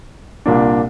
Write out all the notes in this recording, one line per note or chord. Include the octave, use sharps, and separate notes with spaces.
C2 A#2 A#3 D4